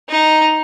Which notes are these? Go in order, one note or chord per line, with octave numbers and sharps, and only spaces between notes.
D#4